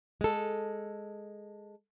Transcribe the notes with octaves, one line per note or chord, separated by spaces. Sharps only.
G#3 A4